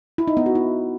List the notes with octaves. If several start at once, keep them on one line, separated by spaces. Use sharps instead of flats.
E4
D#4
B3
F#4
E4